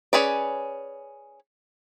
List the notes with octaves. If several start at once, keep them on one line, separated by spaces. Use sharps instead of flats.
C#4 G#4 B4 D5